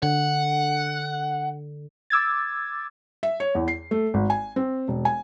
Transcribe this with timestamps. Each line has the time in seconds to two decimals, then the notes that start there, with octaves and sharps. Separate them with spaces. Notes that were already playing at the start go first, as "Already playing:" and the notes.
0.03 D3 F#5
2.10 D6 E6 G#6 A6
3.23 E5
3.40 C#5
3.55 E2
3.68 C7
3.91 A3
4.14 G#1
4.30 G#5
4.56 C4
4.88 E1
5.05 G#5